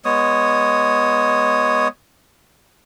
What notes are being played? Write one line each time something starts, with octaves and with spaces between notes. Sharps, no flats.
G#3 B3 C#5 D#6